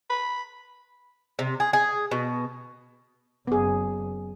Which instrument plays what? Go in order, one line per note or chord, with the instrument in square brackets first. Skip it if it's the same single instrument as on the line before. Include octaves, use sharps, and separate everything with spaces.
[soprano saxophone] B5
[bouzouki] C3
G#4
G#4
B2
[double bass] F#1 [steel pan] B3 G#4